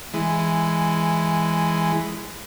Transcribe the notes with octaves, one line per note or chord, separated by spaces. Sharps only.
E3 G#3